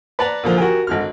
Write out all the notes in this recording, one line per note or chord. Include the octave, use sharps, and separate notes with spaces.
B4 D5 F#5 A5 A#5
A#2 D3 F3
F#4 G4 A#4 G#5
G#1 D3 F6